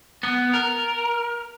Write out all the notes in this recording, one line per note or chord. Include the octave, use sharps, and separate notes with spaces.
B3
A#4